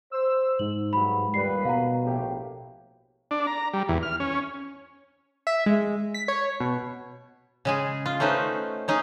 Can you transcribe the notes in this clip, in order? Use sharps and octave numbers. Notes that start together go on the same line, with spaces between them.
C5 E6
G#2 F#7
G2 F#3 B5
D#2 A#2 G3 B4 C7
B2 F5 F#5 A#5
A#1 A2 G4
D4
A#5
G3
E2
F6
C#4
E5
G#3
B6
C#5
B2
C#3 G#3 G#4
F4
A3 C#4 D#4 B4 C5
C#4 D#4 G#4